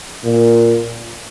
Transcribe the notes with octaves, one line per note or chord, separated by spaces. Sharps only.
A#2